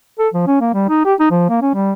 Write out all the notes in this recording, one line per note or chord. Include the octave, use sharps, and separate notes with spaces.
A4
F3
C#4
A#3
G3
D#4
G4
D#4
F3
A#3
C#4
G3